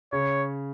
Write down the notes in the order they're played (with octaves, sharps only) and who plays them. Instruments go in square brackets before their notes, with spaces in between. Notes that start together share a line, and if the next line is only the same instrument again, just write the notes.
[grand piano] C#3 [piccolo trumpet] C#5